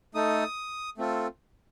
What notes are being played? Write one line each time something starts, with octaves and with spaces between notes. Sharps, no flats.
A3 D#4 A4 D#6
A3 C4 F4 A4